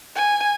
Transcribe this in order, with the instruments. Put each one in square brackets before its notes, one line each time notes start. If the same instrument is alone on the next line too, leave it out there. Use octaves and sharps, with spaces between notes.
[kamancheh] G#5